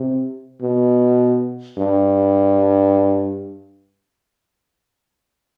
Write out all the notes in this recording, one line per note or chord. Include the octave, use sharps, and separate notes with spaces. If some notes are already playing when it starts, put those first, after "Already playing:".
Already playing: C3
B2
G2